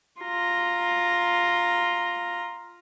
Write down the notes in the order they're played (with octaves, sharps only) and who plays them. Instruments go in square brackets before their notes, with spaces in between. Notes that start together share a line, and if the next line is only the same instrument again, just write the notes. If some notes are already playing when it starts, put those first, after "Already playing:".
[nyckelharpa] F4 A#5